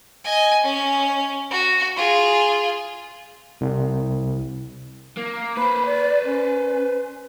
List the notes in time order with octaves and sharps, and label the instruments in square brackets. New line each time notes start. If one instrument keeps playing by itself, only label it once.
[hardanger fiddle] D#5 G#5
C#4
F#4
F4 G#4
[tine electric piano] C2
[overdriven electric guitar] A#3
[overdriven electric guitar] B4 C5 [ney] B5
[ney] D5
C#4